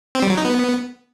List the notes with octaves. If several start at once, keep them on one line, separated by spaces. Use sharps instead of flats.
C4
G3
F#3
D#4
B3